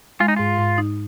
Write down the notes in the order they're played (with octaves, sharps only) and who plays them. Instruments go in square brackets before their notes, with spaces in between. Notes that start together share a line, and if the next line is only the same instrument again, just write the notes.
[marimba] G#3 [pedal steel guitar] F4
[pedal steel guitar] D#4
[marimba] G#2 [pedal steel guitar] F4
[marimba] G#2
D#4